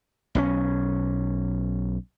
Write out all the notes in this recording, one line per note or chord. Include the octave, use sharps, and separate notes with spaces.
B1 F3 C#4